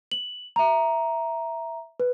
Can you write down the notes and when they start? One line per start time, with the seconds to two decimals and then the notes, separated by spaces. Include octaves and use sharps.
0.12 F#7
0.56 E5 A#5
2.00 B4